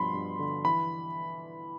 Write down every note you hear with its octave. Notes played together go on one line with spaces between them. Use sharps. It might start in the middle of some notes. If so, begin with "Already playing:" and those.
Already playing: G2 B2 F3 B5 C6
G2
D3
E3 B5